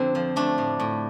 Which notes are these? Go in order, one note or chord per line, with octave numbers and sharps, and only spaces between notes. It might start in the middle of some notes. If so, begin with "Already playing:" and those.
Already playing: F2 D3 C4
F3
A3 D4
A2
A2